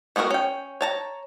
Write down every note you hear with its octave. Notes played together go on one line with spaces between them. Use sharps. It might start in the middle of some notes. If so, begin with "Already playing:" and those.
A3 B3 D4 F#4 A#4
C#4 G5
C#5 A5 A#5